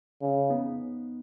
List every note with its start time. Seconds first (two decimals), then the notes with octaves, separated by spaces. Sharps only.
0.21 C#3
0.50 B3 D#4